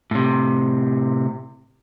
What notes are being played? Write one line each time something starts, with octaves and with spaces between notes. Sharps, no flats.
A2 C3